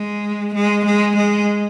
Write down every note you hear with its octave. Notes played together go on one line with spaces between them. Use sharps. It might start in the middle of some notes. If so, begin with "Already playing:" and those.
Already playing: G#3
G#3
G#3
G#3